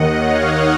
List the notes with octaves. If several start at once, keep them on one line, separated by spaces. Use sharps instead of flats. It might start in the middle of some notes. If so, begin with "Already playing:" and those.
Already playing: D#2 D#3 D#5 F#5
C#5 F5